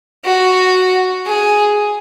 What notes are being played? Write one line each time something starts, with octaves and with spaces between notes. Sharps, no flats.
F#4
G#4